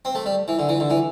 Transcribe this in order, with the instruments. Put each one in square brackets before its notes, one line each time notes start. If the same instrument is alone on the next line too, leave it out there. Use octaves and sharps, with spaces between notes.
[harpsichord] C4
A3
G3
E3
D3
E3
D3
E3